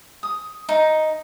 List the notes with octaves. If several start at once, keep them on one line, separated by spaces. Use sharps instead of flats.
D#6
D#4